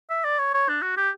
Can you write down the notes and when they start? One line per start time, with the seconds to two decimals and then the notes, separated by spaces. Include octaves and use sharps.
0.10 E5
0.24 D5
0.39 C#5
0.54 C#5
0.68 D4
0.82 F#4
0.97 G4